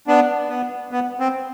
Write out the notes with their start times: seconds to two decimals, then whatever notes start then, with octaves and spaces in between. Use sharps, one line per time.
0.07 B3 D4
0.49 B3
0.91 B3
1.20 C4